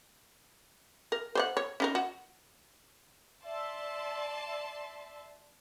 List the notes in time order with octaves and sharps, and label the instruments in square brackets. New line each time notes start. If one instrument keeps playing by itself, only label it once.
[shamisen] A#4
C5 C#5 F#5
C#5
C#4 D#4 A#4
F#4
[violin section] D5 A5 C6 [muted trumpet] E5
[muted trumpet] E5